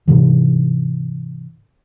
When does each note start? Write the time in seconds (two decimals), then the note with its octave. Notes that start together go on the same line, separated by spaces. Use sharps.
0.08 G#2 C3 E3